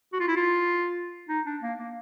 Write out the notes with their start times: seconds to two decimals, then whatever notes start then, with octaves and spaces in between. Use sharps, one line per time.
0.13 F#4
0.20 F4
0.28 E4
0.37 F4
1.29 D#4
1.45 D4
1.62 A#3
1.78 A#3